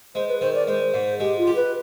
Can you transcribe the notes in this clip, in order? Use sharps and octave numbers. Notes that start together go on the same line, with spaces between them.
G#3 C5
B4
D#3 C5
D5
G#3 C5
G#2
G#3 G4
F4
G4
B4